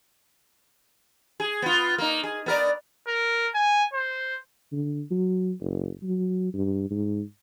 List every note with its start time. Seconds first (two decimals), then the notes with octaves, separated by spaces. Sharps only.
1.40 G#4
1.62 B3 F4
1.98 A#3 D#4
2.24 G#4
2.46 B3 A#4 D5
3.07 A#4
3.54 G#5
3.93 C5
4.72 D3
5.11 F#3
5.60 F#1
6.03 F#3
6.54 G2
6.90 G#2